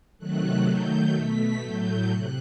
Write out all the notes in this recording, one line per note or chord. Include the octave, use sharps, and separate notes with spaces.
C3 D#3 F#3 A3 F#6
D#3 F#3 A3 G6
B2 A3 B6
A2 F#3 A3 G6
C3 F#6